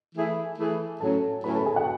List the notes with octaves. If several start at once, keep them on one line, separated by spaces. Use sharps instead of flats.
E3 A3 E4 G#4
E3 A3 E4 G#4
A2 F#3 C#4 A4 A5
A2 F#3 C#4 B4 B5
A4 A5
G#4 G#5
F#4 F#5